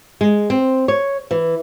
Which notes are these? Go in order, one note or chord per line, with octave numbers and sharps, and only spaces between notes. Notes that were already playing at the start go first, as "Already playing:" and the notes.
G#3
C4
C#5
E3